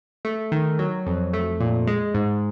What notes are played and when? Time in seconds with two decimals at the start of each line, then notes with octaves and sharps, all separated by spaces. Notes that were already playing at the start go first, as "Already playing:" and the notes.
0.25 A3
0.52 D#3
0.79 F#3
1.06 F2
1.33 A3
1.60 A#2
1.87 G#3
2.15 G#2